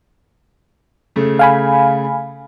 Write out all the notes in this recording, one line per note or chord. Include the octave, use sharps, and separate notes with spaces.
C#3 A3
F5 G#5 B5